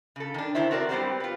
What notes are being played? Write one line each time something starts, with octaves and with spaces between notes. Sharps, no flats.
C#3 A4
D#3 D4
D3 D#3 E4 C5 E5
C4 F#4 A#4 B4 D5
G3 B3 C4 G4 C5
F4 B4